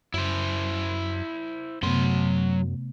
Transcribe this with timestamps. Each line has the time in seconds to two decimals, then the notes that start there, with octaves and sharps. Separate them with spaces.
0.14 F#2 E4 C5
1.83 F#2 C3 F#3 A3 B3 C6